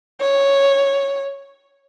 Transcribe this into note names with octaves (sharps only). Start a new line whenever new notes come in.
C#5